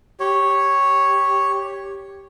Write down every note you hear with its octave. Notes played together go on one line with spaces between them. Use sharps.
G4 C#5